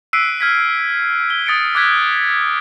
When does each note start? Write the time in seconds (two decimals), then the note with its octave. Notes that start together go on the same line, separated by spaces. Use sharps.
0.13 E6 F#6 B6 C7 D7 D#7
0.41 F6 G#6 B6
1.30 G7
1.47 D#6 A6 C#7 D7
1.75 D6 F#6 G#6 B6